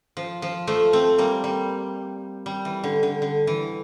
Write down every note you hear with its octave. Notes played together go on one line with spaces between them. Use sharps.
F3
F3
F3 A3
A3 C4
G3 A#3
G3
G3
E3
D3
D3
D3
E3